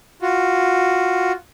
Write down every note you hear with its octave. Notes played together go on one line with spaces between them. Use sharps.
F4 F#4